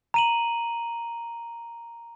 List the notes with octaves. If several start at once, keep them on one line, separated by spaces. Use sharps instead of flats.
A#5 D#7 F#7